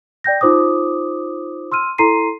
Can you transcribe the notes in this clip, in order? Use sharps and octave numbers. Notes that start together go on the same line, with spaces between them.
D5 G5 G6 A#6
D#4 F4 C5 D6 D#6
C6 E6 F6 D#7
E4 A4 A#5 C6 C7 D#7